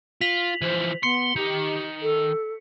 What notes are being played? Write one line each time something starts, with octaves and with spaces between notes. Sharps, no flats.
F4 B6 F7 F#7
E3 F3 C5
B3 C6 C#7
D#3 G4
A4